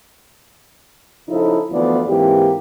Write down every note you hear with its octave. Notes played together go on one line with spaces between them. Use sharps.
C#3 F3 D#4 E4 A4
D2 E3 F3 B3 F4 D5
G#2 E3 A#3 C4 G4